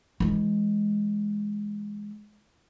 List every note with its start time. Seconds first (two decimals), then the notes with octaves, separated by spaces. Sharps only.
0.20 E3 G#3